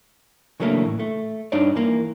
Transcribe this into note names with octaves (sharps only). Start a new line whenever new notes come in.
C#3 E3 F#3 A3 A#3 D4
A2
A3
G2 D4 D#4 C#5 D5
E3 A#3